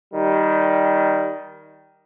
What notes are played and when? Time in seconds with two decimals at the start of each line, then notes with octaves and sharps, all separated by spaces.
0.14 D#3 G3